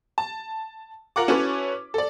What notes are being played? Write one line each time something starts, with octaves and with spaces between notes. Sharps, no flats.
A5
F4 A#4 F#5 D6
C#4 E4 F#4 A4 B4 C#5
A4 D5